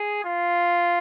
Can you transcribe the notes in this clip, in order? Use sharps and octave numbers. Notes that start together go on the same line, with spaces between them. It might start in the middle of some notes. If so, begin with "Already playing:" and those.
Already playing: G#4
F4